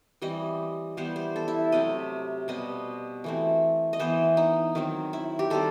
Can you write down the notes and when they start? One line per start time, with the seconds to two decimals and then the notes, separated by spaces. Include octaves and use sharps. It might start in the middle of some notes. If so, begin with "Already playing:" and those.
0.22 E3 G3 C4 D#5
0.97 E3 G3 B3 C5
1.16 C5
1.36 A4
1.48 E4
1.72 C3 F#3 A3 C4 D#5
2.48 B2 G3 C4 D#5
3.24 E3 A3 C4
3.93 D#5
4.00 E3 B3 C5
4.37 D#4
4.75 D#3 F#3 C4
5.13 E4
5.39 G4
5.50 D#3 G3 C4 A4